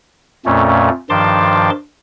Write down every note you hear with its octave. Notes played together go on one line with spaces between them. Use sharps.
F2 A#2 A3 C#4
G2 D#3 F3 A5 C6 D6